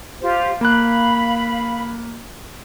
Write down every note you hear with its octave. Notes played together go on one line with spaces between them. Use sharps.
F4 G4 C5
A#3 F5 B5 F#6